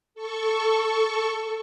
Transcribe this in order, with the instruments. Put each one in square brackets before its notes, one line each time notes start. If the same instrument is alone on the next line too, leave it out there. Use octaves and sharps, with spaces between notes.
[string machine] A4 C#6